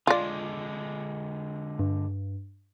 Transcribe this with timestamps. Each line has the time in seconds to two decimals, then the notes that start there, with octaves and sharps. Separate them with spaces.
0.07 D3 G#3 F4 D5
1.79 G2